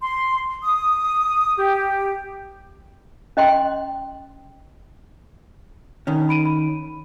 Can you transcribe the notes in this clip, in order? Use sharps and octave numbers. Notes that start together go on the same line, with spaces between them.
C6
D#6
G4
C#4 D#5 G5 C6
D#3 C#4
B5 D7 D#7
B5